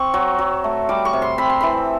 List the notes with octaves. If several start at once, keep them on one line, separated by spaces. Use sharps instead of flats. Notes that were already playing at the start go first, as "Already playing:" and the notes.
Already playing: C4 C#6
F#3
F#3
A3
G3 D6
C#6
C3
C6
C4 B5
C6
E3 B5